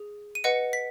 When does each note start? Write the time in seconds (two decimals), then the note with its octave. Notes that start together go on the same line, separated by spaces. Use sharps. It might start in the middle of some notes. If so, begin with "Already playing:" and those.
Already playing: G#4
0.35 D#7
0.44 B4 D#5 F#5 C#7
0.73 B6